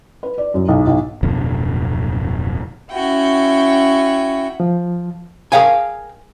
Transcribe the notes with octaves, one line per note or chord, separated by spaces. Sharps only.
B4
D5
F#2
B1
B1
D1 F2 B2 D3
C#4 E4 F#4 G5
F3
G#4 A#4 F5 G5 G#5